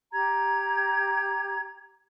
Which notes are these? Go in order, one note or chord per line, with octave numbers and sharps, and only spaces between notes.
G4 A#5 G#6